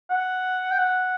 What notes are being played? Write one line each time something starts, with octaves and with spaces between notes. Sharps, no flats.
F#5
G5
F#5